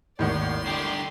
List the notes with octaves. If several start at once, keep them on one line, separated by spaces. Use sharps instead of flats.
G#1 D#2 A2 D#3 D5 F#5 C6
D3 G4 G5